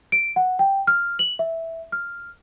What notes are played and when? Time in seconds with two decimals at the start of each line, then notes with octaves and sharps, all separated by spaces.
0.12 D7
0.36 F#5
0.59 G5
0.87 F6
1.19 F#7
1.39 E5
1.92 F6